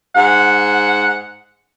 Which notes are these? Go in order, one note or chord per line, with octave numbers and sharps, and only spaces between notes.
G#2 F#5